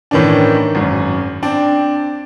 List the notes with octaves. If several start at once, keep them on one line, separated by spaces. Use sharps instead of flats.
A2 D#3 E3 C#4 D4
G#1 F#2
C4 D4